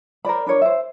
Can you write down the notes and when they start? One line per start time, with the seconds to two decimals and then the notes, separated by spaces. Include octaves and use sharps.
0.25 A#4 C5 D5 B5
0.46 D4 A#4 C#5 D5
0.62 C5 E5